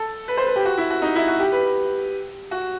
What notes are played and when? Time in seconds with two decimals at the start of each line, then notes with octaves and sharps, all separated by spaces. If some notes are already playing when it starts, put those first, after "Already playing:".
Already playing: A4
0.28 B4
0.37 C5
0.47 B4
0.56 G4
0.65 F#4
0.78 E4
0.90 F#4
1.02 D#4
1.15 E4
1.28 F#4
1.40 G4
1.52 B4
2.51 F#4